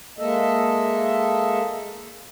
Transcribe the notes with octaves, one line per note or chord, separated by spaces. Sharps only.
G#3 A#3 A4 D#5 E5